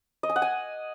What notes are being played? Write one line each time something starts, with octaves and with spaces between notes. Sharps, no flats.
D#5
G#5
F#5
G#5